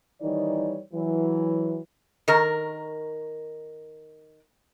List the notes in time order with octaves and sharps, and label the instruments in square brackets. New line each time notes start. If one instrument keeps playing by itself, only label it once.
[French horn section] D#3 E3 G3 D#4 C#5 D5
E3 F#3
[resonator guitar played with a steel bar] D#3 A#4